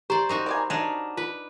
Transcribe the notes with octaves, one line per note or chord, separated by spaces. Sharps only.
G4 C5 D5 A#5
C4 D#4 F#4 C#6
A#4 D5 G#5 A#5 B5 D6
D4 D#4 F#4 A#4 C#5
F4 B4